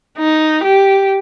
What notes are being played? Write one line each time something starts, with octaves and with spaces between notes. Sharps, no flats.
D#4
G4